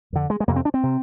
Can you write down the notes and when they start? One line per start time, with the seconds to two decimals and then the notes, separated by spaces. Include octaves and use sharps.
0.13 F2 D3
0.30 G#3
0.40 G#3
0.48 F2 C3 A#3
0.56 C4
0.65 D4
0.74 C4
0.83 C3